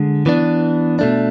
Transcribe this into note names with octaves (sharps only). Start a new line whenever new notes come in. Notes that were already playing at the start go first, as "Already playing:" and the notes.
Already playing: D3 G#3
E3 B3 D4
B2 A3 D4